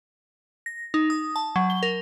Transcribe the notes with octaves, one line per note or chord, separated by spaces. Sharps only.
A#6
D#4
D#6
A5
F#3
G7
A#4